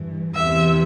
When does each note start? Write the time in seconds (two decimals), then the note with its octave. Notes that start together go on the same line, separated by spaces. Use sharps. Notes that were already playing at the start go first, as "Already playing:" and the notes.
Already playing: G2 E3
0.35 E2 C3 E3 E5